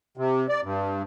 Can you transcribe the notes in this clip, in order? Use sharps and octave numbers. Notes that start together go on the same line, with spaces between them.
C3
D5
G2